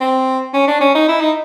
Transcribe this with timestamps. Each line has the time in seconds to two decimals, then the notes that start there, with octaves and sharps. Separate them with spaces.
0.01 C4
0.54 C#4
0.67 D4
0.80 C#4
0.95 D#4
1.08 E4
1.21 D#4